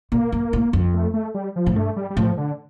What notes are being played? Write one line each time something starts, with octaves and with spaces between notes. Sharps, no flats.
A#2 A#3
G2
A2
F2
A3
A3
G3
F3
A2
G2 A3
G3
G3
A2 F3
D3